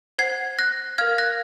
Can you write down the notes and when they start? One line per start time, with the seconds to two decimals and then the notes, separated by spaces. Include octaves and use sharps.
0.18 C5 F#5 G#6 C7
0.59 F#6 A#6
0.98 A#4 F5 F6 G#6
1.18 F#6 A#6